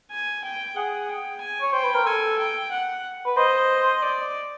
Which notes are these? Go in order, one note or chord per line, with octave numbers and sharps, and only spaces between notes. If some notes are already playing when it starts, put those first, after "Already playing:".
G#5
G5
G#4 F#5
G5
G#5
C#5
C5 G5
B4
A#4
A4 G#5
G5
F#5
B4
C5 D#5
D5